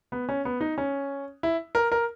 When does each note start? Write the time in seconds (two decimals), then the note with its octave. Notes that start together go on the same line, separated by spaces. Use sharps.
0.12 B3
0.29 C#4
0.45 B3
0.61 D#4
0.78 C#4
1.43 E4
1.75 A#4
1.92 A#4